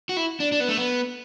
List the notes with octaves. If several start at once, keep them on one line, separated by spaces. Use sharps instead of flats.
F#4
E4
D4
D4
B3
A3
B3